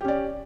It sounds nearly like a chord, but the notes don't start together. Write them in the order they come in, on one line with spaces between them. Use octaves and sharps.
G4 C#4 D5